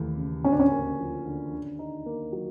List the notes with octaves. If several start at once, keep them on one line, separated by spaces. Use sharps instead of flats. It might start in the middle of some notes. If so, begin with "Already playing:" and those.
Already playing: D#2 E3 A3
C#3
D2 C#4
D4
C#4
A#3
F3
D3
D3
D#4
A#3
F#3